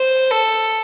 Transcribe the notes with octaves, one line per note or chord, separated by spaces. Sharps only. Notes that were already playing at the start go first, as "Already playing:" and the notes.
Already playing: C5
A4